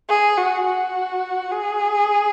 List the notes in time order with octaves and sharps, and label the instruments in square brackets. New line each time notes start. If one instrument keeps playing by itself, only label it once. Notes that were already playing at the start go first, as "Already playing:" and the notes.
[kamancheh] G#4
F#4
F#4
G#4